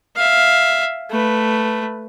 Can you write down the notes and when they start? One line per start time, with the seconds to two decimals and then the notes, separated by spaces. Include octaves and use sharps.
0.16 E5 F5
1.10 A3 B4